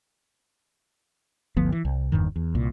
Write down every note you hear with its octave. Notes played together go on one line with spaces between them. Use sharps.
G1 D2 F3 B3
E3
C2
F#1 E2 G2 D#3
E2
C2 A#2